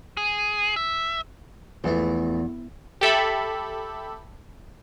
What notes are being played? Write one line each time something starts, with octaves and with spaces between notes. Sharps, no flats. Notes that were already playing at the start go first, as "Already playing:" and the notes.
G#4
E5
A#1 E2 E3 A3
G4 A4 E5 B5